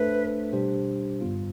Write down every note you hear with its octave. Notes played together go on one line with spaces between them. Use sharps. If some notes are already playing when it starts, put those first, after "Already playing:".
Already playing: A3 D4 A4 B4 C5 E5
B2 G3 D4 G4 C5
G2 D3 G3 B3 F4